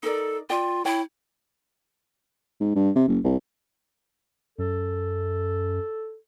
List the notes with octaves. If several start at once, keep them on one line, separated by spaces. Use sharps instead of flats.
D#4 A4 A#4 D5
F4 D5 G5
E4 C#5 G5
G#2
G2
C3
F#1
C2
F#2 A4